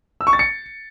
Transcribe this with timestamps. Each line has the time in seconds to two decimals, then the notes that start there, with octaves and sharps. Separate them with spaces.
0.21 E6
0.27 C#6
0.33 A6
0.39 C#7